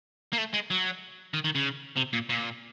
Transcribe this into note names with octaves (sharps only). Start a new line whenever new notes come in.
A#3
A3
G#3
F#3
D#3
D#3
C#3
C3
A#2
A#2